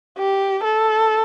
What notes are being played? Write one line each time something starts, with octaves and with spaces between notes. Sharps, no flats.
G4
A4